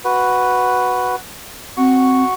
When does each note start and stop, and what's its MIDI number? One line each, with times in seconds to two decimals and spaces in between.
0.05 1.16 66
0.05 1.16 71
1.77 2.23 60
1.77 2.34 66
1.77 2.34 85